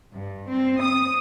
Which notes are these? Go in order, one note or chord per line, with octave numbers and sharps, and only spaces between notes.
G2
C4
D#6